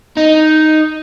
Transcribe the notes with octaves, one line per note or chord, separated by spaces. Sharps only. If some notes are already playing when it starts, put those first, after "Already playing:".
D#4